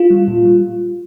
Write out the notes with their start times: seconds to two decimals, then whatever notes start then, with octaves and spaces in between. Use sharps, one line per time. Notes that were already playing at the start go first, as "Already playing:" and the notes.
Already playing: F4
0.10 G3
0.28 A#2
0.45 G3